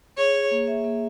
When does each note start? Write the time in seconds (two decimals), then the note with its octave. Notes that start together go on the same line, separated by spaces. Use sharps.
0.18 G#4 C#5
0.34 G#4
0.51 A#3
0.67 E5
0.84 A#3